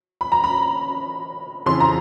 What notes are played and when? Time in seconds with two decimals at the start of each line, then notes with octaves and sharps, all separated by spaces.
0.21 B5
0.32 A#5
0.44 B5
1.66 F2 C#3 E3 C6
1.80 A#5